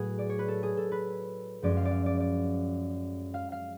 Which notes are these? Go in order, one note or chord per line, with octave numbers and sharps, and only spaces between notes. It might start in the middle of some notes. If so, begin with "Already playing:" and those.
Already playing: A2 F#3 A3 F#4 G#4 B4
D5
C#5
B4
A4
G#4
A4
B4
F#2 F3 G#3 C#4 D5
F5
D5
F5
D5
D5
F5
F5